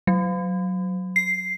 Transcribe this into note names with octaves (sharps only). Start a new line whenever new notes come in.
F#3
C7